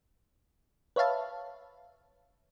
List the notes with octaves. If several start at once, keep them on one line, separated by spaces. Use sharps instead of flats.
B4 C#5 E5 F5 A5